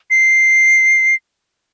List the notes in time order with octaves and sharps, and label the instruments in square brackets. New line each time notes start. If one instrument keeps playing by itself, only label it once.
[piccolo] C7